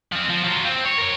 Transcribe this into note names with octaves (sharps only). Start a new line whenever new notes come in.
F3 C4
F3
F#3 F4
C4
C#5
A#4 C#5